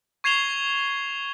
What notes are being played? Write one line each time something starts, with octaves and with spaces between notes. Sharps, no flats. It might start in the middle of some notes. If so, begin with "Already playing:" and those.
C#6 G#6 C7 E7 F7 G7